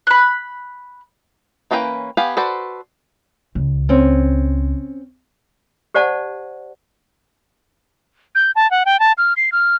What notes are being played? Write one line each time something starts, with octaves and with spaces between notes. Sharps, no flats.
B5 F#6
E3 A#3 C#4 B4 G5
B3 G4 F5 G#5
F#4 A4 B4 C5 D5
C#2
C4 C#4
G4 C5 D5 F#5 A5
G6
A5
F#5
G5
A5
F6
C7
F6